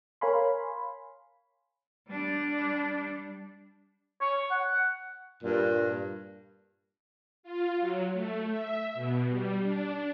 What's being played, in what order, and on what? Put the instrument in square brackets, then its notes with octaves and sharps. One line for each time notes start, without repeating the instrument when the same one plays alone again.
[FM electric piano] A#4 C#5 F5 G#5 B5 C6
[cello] G3 D4
[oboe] C#5
F#5
[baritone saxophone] G2 [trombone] A#2
[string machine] F4
F#3
A3
E5
B2
G3
D4